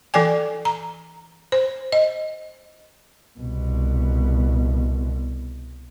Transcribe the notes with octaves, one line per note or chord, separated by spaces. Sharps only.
E3 A4 D5 G5 G#5
A#5
C5
D#5
C2 B2